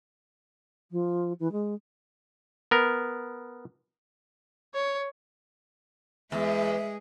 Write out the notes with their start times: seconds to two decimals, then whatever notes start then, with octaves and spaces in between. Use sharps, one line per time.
0.91 F3
1.39 E3
1.52 G#3
2.71 B3 A#4
4.74 C#5
6.32 E2 G#3 G#4 E5